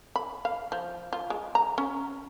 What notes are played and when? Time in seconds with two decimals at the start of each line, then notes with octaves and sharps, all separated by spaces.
0.16 B5
0.45 F5
0.72 F3
1.13 F4
1.30 G#3
1.55 A#5
1.78 C#4